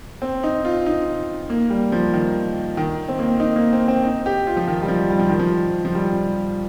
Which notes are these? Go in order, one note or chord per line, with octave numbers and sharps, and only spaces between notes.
C4
D#4
F4
D#4
A#3
G3
F3
D#3
D#3
C4
A#3
D#4
A#3
C4
C4
D#4
G4
F4
F3
D#3
G3
F3
G3
F3
D#3
F3
F3
G3